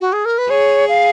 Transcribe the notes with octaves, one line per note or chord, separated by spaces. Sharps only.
F#4
G#4
A#4
B4
G#4 C#5
F5